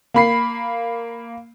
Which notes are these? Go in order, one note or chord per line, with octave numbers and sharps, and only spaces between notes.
A#3 B5 C7